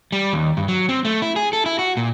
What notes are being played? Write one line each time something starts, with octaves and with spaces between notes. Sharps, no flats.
G3
D#2
G2
F#3
C4
A3
E4
G#4
A4
E4
F#4
A#2